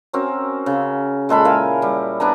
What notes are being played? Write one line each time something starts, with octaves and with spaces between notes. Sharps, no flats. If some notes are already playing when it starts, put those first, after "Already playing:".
C4 C#4 F#4 A#4
C#3
A#2 G#3 A4 B5
E4 A#4 F5 G#5
G3
B3 D4 G#5 A#5